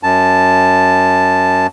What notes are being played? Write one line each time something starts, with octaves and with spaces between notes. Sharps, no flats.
F#2 A5